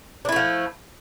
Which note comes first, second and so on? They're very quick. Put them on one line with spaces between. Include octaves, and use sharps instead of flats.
D4 E4 A3 F3